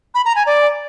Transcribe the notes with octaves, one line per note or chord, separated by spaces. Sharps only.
B5
A#5
G#5
D5